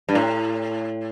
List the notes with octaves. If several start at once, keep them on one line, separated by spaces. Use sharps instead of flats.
G2
A2